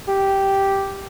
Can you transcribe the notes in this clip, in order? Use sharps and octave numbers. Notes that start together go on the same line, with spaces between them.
G4